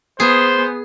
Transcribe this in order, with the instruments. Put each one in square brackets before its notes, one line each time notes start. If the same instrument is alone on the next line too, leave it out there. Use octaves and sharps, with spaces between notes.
[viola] B3 [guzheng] G#4 [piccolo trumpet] C5